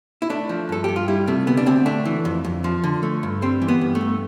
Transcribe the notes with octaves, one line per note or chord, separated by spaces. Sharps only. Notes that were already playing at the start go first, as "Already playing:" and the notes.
E4
A3 D4
F3
G2 A4
G2 G4
F4
G3 E4
C3 A3
D2 B3
D4
D2 C4
A3 D4
E3
F2
F2
F3
D3
A3
G2
G3 C4
E3
B3
G2
A3
G2